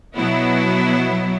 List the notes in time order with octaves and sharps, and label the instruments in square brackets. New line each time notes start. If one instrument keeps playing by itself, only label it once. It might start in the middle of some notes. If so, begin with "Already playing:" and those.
[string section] B2 F#3 B3 E4